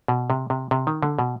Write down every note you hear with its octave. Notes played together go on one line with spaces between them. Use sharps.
B2
C3
C3
C3
D#3
D3
B2